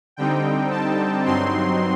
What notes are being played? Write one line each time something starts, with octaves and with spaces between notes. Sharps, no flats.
D3 G3 C4 D#4 G5
A5
G2 F#3 C4 D#4 C6